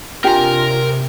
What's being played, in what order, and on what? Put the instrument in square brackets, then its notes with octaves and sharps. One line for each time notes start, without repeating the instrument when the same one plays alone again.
[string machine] C3 [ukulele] D4 G4 G#5 [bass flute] F4 [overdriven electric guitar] A#4 A#5